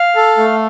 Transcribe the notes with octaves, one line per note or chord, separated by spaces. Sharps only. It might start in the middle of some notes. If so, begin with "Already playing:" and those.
Already playing: F5
A4
A3